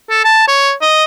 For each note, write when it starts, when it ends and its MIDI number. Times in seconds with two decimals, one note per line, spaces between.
0.10 0.20 69
0.24 0.43 81
0.48 0.72 73
0.82 1.05 75